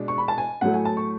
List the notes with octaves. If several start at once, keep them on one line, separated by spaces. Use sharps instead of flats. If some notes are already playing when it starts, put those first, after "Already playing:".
Already playing: B2 G#3 D4
C#6
B5
A5
G#5
A2 F#3 A3 F#5
G#5
A5
C#6